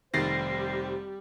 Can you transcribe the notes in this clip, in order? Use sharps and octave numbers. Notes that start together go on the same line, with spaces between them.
F1 D#3 G3 G4 C5 A6 A#6 C7